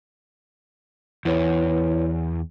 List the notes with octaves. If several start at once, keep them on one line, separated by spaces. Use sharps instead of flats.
E2 E4 B4 C#5